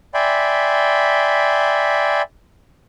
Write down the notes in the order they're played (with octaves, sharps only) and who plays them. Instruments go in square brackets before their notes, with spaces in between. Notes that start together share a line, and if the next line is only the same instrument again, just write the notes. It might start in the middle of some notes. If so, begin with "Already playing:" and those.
[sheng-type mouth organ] D5 E5 G5 G#5 B5 C6